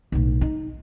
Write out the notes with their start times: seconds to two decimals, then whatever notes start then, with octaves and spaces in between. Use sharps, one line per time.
0.12 B1 A2
0.41 D#4